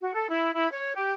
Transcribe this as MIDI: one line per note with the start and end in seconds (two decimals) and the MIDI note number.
0.01 0.13 66
0.14 0.27 69
0.29 0.51 64
0.55 0.68 64
0.72 0.92 73
0.94 1.12 67